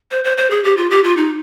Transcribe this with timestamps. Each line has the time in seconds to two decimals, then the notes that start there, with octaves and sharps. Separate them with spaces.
0.11 C5
0.24 C5
0.37 C5
0.51 G#4
0.64 G4
0.77 F4
0.91 G4
1.04 F4
1.17 D#4